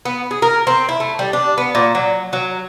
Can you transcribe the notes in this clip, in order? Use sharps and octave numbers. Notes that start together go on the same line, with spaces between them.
B3
G#4
A#4
C4
E4
A3
G3
D4
B3
A#2
F#3
F#3